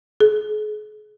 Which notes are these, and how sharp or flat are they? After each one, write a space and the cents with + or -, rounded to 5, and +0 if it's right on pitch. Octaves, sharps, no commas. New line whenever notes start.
G#4 +40